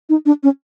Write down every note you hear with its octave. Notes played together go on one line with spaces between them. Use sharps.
D#4
D4
C#4